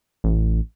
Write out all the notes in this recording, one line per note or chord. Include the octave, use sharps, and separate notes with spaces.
A1